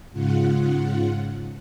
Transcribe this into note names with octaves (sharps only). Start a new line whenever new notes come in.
G#2 C#3 F4 F#5